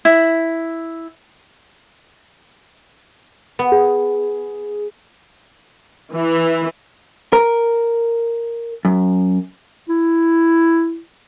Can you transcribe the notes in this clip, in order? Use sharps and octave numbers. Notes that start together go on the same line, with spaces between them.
E4
B3
G#4
E3
A#4
F#2
E4